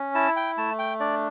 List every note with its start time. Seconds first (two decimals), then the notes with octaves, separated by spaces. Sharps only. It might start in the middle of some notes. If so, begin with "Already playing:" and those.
Already playing: C#4
0.15 E4 A5
0.36 G5
0.57 A3 A5
0.79 G5
1.00 D4 D5